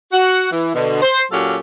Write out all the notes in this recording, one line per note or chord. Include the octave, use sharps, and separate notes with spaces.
F#4 F#5
E3
B2 D3
C5
A#2 F#3 C#4 G4 A4 F5